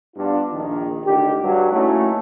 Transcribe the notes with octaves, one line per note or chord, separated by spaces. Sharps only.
G2 B3 D4 F4
A#1 D#3
D2 D3 D#3 G4
G2 F#3
A3 A#3 C#4 D#4 E4 F#4